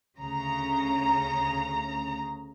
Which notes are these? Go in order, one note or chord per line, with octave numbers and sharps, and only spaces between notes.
D2 C#3 A#5